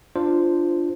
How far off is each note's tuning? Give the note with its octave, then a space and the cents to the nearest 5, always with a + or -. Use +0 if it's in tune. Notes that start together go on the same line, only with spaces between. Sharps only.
D4 +10 F4 -10 C5 +0